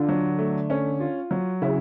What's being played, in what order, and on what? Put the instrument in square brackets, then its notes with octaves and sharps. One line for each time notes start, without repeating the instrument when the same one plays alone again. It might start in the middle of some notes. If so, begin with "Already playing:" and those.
Already playing: [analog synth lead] D3 [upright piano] F4
[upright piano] F#3
A3
C#4
F4
F#3
[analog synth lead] C#3 [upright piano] E4